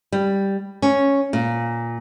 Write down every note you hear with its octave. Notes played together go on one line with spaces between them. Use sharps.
G3
C#4
A#2